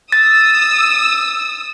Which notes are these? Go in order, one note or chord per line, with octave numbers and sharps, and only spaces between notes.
D#6 E6 A6